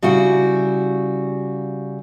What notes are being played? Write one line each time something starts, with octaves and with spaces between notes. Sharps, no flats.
C#3 G3 E4 F#4